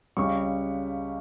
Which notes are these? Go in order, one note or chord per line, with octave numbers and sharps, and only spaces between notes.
C#2 C#3 G3 C#6